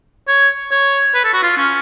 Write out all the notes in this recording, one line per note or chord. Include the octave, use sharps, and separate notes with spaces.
C#5
C#5
B4
A4
F#4
F4
C#4